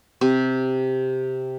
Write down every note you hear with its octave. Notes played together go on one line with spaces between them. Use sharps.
C3